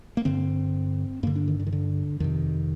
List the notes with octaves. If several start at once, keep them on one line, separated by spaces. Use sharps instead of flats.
A#3
G2 D3 C4
G2 D3 A#3
D4
D#3
D3
D#3
D3
F2 C3 D#3